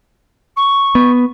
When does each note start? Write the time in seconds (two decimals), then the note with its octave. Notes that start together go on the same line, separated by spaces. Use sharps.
0.56 C#6
0.95 B3